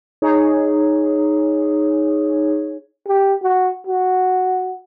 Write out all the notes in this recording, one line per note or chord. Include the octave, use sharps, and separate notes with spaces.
D#4 G#4 C#5
G4
F#4
F#4